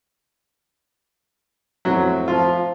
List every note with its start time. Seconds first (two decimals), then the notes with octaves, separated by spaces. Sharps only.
1.85 F1 F#3 C4 E4
2.28 F3 F4